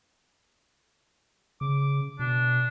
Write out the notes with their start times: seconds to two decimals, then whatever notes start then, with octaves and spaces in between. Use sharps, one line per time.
1.61 C#3 D6
2.19 B2 D4